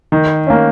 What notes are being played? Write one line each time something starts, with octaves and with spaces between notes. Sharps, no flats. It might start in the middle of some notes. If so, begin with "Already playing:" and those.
D#3
A#3 C#4